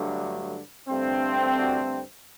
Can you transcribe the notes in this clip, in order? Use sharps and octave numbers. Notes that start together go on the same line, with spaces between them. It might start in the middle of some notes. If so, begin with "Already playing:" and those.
Already playing: G2 D3 F#3 A3
G2 D3 A3 C4
D4 F#4